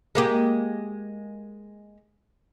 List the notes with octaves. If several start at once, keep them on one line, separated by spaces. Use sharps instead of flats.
G#3 A#3 G4